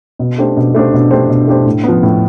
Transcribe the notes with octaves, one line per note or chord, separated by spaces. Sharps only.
B2
A3 D4 G4 C5
B2
A3 D4 G4 C5
B2
A3 D4 G4 C5
B2
A3 D4 G4 C5
A2
F3 B3
A2